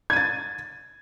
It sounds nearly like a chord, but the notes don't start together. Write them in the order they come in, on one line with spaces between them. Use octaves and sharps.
G#6 D#7 A6